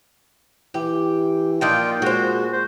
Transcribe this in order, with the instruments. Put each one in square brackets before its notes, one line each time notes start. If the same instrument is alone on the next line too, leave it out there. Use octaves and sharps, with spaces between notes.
[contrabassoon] E3 [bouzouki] G4
[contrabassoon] A#2 [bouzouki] F3 D#4 D5 [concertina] F4 G5
[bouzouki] G#3 C5 [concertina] F#4
[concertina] C5